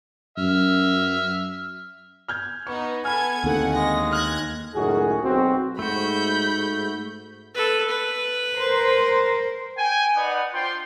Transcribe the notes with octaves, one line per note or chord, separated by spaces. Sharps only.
F#2 E5 F6
F6 G6 G#6
B3 D#4 C#6
B3 A4 G#5 B5 F6 G#6
D#2 D3 A3 C4 F#5
G#3 A#6
F6 F#6 G#6 A#6
C#2 F#2 A2 D#3 F#4 G#4
B1 C4 F#4
G#2 A3 F#4 B5 G6
A4 B4
B4
A#4 C5
G5 G#5
D#4 B4 D5 F#5
D4 F4 C5 G5 C6